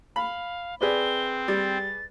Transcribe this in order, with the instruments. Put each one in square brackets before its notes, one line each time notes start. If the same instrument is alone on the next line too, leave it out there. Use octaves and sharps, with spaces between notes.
[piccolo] F5 [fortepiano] B5
[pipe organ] C4 [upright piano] G#4 B4 D5 [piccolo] G7
[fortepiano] G3 [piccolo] A6